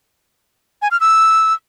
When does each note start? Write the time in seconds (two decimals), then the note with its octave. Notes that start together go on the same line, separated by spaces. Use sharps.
0.82 G#5
0.91 F6
1.00 E6